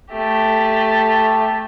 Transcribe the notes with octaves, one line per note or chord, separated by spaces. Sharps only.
A3 G4